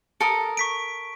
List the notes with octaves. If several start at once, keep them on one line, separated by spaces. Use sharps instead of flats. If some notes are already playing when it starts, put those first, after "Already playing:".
A4 A#4 D#6
C#6 B6 D7